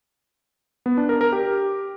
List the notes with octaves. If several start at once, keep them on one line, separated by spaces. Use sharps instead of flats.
B3
D4
A#4
A#4
G4